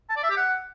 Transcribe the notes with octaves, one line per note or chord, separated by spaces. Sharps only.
A5
D5
E5
G4
F#5